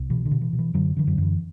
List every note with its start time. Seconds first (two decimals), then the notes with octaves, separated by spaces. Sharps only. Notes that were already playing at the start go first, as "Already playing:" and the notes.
Already playing: C2
0.10 B2 E3
0.25 D3
0.31 B2
0.42 E3
0.53 B2
0.59 E3
0.74 F#2 D3 F#3
0.97 D3 E3
1.07 F#2 F#3
1.18 F#2 E3